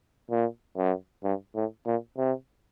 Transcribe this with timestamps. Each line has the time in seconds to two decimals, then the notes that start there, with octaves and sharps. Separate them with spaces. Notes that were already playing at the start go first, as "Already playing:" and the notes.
0.31 A#2
0.77 F#2
1.24 G2
1.55 A2
1.86 A#2
2.18 C3